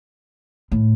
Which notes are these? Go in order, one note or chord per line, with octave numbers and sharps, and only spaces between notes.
A2